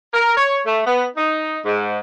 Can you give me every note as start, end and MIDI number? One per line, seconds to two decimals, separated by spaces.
0.14 0.36 70
0.37 0.58 73
0.65 0.81 57
0.85 1.05 59
1.16 1.59 63
1.65 1.98 44